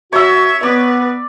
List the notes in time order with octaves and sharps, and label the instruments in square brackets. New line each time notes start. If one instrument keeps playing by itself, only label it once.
[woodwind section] F#4 [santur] C#5 E6 [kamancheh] E5
[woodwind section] B3 [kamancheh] B4 [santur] D5